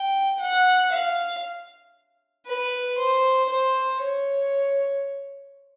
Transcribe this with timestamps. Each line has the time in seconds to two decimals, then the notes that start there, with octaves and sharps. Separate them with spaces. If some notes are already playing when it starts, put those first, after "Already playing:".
Already playing: G5
0.40 F#5
0.92 F5
2.46 B4
2.98 C5
3.49 C5
4.01 C#5